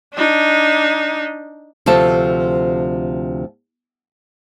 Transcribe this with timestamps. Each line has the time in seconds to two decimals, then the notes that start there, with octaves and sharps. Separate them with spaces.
0.14 D4 D#4
1.86 D2 C3 F3 A4 A5